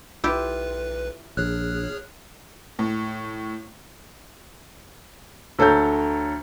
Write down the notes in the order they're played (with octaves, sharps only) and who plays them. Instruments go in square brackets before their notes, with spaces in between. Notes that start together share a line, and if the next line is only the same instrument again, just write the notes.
[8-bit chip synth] B1 B4 [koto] E4 G4 [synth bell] F4
[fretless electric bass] A#1 [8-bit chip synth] G#4 C#5 F6 [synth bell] F#6
[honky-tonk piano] A2
[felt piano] D2 A4 C#5 A#5 G6